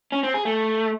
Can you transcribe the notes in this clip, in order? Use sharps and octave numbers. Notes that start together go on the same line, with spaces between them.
C#4
C4
G#4
A3